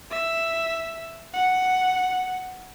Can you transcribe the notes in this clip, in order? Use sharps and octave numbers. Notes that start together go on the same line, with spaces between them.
E5
F#5